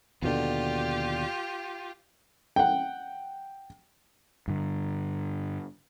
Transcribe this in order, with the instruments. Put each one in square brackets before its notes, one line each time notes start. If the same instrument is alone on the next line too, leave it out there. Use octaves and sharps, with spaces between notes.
[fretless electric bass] D#2 B2 D3 [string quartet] F4 G4
[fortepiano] F#5 G5
[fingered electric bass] G2 D3